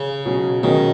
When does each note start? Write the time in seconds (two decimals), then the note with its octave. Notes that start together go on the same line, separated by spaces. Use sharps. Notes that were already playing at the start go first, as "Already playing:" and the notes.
Already playing: C#3
0.26 B2 F#3 C#4 G#4
0.63 B2 D#3 F#3 C#4 G#4